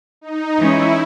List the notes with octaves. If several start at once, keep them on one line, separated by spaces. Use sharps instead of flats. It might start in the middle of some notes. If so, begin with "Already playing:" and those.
D#4
E3 G#3 C#4 E4